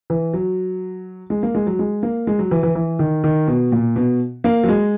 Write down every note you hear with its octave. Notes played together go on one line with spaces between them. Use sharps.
E3
F#3
G#3
A#3
G#3
F#3
G#3
A#3
G#3
F#3
E3
E3
E3
D#3
D#3
B2
A#2
B2
A#3
F#3
G#3